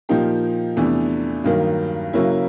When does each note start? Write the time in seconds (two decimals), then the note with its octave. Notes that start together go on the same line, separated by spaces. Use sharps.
0.09 A#2 F3 A#3 D#4 G4
0.76 E2 C3 E3 A3 D4
1.44 G2 D#3 F#3 A#3
2.13 C#3 F#3 A#3 C#4 E4